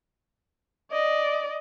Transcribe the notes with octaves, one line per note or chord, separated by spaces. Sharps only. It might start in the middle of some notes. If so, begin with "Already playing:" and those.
D5 D#5